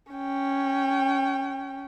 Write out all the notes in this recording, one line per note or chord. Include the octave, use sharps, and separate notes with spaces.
C#4 G5